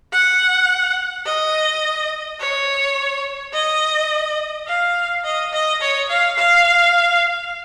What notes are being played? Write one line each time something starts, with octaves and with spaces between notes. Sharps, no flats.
F#5
D#5
C#5
D#5
F5
D#5
D#5
C#5
F5
F5